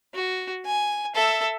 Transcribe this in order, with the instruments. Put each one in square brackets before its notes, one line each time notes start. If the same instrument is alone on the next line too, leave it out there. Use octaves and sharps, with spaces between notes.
[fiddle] F#4
G#5
A4 E5